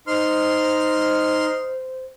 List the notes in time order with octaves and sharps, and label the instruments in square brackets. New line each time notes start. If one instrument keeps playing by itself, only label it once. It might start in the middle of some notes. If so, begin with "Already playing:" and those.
[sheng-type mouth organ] D#4 C6 F6 [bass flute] C5